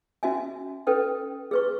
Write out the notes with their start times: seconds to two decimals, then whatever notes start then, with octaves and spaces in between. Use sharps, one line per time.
0.23 C#4 F#4 E5 G#5
0.87 C#4 A4 B4 G5
1.51 G#4 B4 C#6